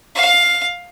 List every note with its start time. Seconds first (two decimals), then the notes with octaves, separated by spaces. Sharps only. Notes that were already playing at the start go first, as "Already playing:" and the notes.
0.15 F5